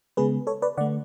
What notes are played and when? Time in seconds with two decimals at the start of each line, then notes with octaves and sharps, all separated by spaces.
0.17 C#3 G#3 B3 G#4 B4
0.47 A4 C#5
0.62 B4 D5
0.77 D3 A3 D5 F#5